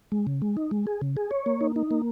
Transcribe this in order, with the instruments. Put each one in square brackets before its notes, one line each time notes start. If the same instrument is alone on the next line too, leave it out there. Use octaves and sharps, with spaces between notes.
[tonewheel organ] G#3
C#3
G#3
D#4
G#3
G#4
C#3
G#4
C#5
A#3
D#4
D#4
A#3